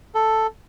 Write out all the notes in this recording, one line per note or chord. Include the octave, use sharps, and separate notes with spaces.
A4